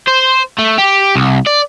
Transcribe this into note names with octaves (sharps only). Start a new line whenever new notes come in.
C5
A3
G4
C2
D5